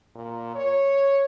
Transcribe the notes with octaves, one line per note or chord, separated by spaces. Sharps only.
A#2
C#5